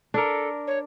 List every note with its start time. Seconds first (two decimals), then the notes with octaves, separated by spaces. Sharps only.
0.14 D4 A4 A#4
0.67 C#5